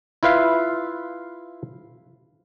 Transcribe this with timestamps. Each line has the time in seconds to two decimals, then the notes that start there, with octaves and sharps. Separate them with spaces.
0.23 E4 F4 B4 E5 F5